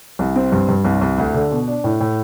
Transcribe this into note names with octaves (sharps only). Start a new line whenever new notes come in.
C2
C4
G2
G2
C2
C2
D2
D3
B2
D4
A2
A2